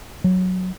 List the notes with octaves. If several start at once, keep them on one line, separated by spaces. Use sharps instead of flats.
F#3